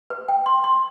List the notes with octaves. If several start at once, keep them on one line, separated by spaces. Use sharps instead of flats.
B4
G5
C6
C6